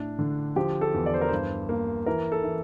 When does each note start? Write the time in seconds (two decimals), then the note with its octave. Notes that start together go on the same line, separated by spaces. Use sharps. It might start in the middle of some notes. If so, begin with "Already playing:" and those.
Already playing: A2 D4
0.19 D3
0.56 F3 G4
0.81 A4
0.94 E2
1.06 D5
1.14 C5
1.21 A#4
1.28 G2 C5
1.69 A#3
2.06 E3 A#4
2.32 A4
2.44 E3